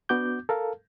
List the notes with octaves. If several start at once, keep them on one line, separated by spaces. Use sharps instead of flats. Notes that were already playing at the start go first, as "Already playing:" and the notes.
B3 D4 F#4 D6 G6
A4 A#4 F5